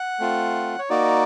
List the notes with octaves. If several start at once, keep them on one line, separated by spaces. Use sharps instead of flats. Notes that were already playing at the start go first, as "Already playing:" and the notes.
Already playing: F#5
A3 C4 F4
C#5
A#3 D#4 F#4 D5